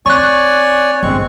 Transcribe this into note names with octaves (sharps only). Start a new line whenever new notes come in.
C4 C#5 D5 G#5 C#6 F#6
G1 G#3 C4 C#6